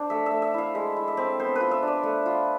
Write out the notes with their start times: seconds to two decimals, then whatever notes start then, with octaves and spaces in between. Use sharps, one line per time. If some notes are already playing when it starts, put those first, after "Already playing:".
Already playing: D4 C5 D5
0.10 A3 E5
0.26 E5
0.31 A3
0.42 E5
0.54 E4 F5
0.75 G#3 E5
0.96 E4
1.08 E5
1.17 C4
1.40 B3 C5
1.55 B4
1.61 F4
1.71 E5
1.82 D4
1.88 D5
2.03 A3
2.26 F4